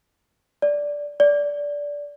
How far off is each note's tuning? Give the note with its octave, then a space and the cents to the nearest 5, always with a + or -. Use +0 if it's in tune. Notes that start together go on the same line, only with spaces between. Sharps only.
D5 -5
D5 -15